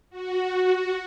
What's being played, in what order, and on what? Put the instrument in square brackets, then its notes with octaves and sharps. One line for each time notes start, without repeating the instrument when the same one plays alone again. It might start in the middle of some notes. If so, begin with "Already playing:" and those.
[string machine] F#4